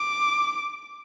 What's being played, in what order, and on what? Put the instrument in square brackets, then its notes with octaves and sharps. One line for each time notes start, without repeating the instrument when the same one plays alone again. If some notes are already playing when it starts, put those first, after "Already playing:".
Already playing: [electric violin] D6